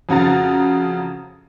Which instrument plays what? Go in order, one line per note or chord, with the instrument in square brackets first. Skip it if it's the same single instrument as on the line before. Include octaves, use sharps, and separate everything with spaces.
[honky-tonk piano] F2 C#3 F#4 A#5 A6